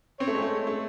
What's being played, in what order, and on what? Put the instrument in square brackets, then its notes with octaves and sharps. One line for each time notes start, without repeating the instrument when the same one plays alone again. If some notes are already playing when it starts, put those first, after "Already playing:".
[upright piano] C4 [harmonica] C#5
[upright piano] A3
G#3
A3
A3